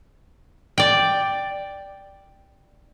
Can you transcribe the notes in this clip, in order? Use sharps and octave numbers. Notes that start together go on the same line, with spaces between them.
D5 G5